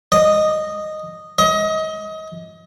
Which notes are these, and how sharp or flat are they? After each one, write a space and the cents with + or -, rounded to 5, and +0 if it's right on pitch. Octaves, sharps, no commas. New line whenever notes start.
D#5 -5
D#5 +30